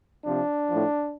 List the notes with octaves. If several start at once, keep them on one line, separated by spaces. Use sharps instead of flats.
C3 F3 D4
A2 F3